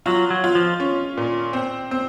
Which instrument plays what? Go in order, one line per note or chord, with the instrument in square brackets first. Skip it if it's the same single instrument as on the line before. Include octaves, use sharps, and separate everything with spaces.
[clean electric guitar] F#3 [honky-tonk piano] F4
[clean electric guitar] F#3
[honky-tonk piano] F4
[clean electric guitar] F3
[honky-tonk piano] C#4
A#2
C4
C4